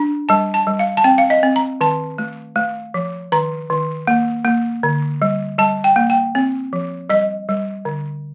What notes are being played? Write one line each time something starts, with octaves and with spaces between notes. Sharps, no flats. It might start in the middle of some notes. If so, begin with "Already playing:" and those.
Already playing: D4
G3 A5
A5
G3
F5
A5
C4 G5
F5
D#5
C4
A#5
D#3 A5
A3
A3
F3
D#3 A#5
D#3
A#3
A#3
D3
G3
G3 A5
G5
A#3
G5
C4
F3
G3 D#5
G3
D3